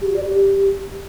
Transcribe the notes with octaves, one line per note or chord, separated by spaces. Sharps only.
G4
F#4
D5
G4